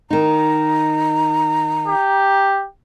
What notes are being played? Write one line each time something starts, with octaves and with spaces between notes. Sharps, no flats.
D#3 D#4 A#5
G4